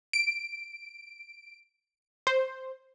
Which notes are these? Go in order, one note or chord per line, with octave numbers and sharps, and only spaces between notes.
D7
C5